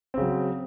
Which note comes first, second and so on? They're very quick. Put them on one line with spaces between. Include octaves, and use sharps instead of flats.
C4 C#3 F#3